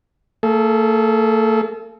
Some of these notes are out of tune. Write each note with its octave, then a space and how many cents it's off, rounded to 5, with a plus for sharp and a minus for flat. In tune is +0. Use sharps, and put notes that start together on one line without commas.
A3 +45 A4 -35